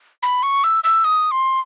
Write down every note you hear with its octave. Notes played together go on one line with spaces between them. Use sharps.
B5
C#6
E6
E6
D#6
C6